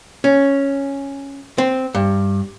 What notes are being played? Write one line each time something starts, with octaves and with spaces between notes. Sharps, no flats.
C#4
C4
G2